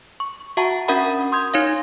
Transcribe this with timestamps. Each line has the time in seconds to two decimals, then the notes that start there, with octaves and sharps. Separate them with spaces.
0.20 C#6
0.57 F#4 E5 F#5 A5 A#5 C#6
0.88 C#4 D4 A#4 E5 F#5 B5
1.32 C6 D#6 G6 G#6
1.54 D#4 C#5 F5